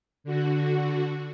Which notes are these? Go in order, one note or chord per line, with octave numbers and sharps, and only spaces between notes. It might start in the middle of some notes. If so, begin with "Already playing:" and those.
D3 F#4